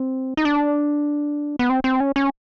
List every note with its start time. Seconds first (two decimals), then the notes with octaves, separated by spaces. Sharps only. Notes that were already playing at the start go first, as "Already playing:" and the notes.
Already playing: C4
0.37 D#4
0.45 D4
1.59 B3
1.70 C4
1.84 C4
2.00 C#4
2.16 C#4